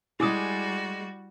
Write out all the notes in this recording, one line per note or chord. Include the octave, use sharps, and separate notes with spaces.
G3 G#3 E4 F#4 G#4 D6 D#6